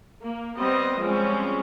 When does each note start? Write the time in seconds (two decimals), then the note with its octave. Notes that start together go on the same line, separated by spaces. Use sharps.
0.22 A#3
0.57 G3 B3 C4 D#5
0.99 F3 G3 G#3 C4 C#4